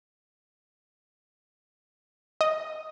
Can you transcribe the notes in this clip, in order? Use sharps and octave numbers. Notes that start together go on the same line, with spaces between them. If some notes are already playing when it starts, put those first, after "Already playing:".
D#5